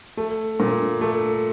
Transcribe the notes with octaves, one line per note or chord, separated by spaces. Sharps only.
A3
A#2
A3